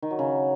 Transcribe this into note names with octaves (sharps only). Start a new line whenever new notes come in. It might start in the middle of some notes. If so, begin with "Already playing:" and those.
D#3
F#3
C#3